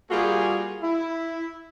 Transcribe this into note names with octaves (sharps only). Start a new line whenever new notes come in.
G3 A#3 F4 F#4 G#4
E4